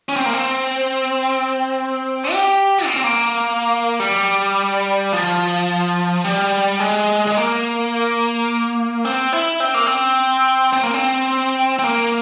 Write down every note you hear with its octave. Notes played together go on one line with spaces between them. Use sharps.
C#4
C4
A#3
C4
G4
A#3
C4
A#3
G3
F3
G3
G#3
G#3
A#3
C4
E4
C4
A#3
C4
C4
A#3
C4
C4
A#3